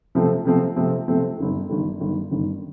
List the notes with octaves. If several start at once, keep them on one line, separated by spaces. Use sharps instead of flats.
C3 F3 A3 C4
C3 F3 A3 C4
C3 F3 A3 C4
C3 F3 A3 C4
G1 G2 D#3
G1 G2 D#3
G1 G2 D#3
G1 G2 D#3